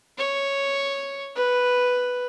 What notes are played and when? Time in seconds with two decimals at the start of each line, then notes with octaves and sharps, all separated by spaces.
0.18 C#5
1.35 B4